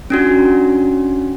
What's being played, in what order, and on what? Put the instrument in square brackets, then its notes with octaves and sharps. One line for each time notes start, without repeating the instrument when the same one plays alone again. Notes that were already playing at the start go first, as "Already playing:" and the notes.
[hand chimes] C#4 D4 F#4